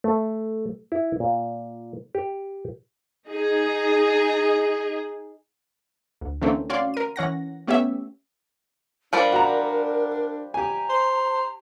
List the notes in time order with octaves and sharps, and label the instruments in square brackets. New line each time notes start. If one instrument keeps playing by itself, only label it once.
[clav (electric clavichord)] A3
E4
A#2
G4
[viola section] D#4 G#4
[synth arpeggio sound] D2
D3 E3 A3 A#3 C4 C#4
C#4 F#4 D5 F5 C6
A#4 D#7
E3 C#4 F#5 A#6
A3 B3 C#4 G4 C#5 E5
[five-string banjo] F3 G3 D5 [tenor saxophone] D4 [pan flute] A#4
[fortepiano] F#4 A#5
[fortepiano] G4 G#5 [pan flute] A#5
[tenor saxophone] C5